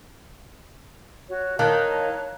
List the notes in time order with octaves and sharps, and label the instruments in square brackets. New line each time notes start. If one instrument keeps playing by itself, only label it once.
[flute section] F#4 C#5
[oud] D#3 [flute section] C#5 A#5 [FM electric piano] F5 A5 F#6